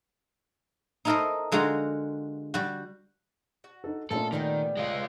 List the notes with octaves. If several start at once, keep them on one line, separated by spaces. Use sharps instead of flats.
D#4 E4 A4 A#4 C5 D#5
D3 G#3 F4 F#4 A#5
G3 F#4
F#4
D#4 A4
A#2 G#3 A3 C#4 F4 A4 A#5
D#3 G3 B3 G4
G#3 F4